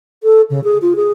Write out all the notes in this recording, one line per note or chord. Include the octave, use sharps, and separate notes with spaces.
A4
C#3
G#4
F4
G#4